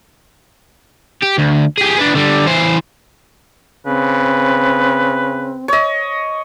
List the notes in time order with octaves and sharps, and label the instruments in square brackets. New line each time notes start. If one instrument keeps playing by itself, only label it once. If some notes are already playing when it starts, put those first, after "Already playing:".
[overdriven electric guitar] G4
D2
G4 G#4
B3 D4
D3 G3
E3 C5
[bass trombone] C#3 [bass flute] C4 [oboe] B4
[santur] C#5 D#5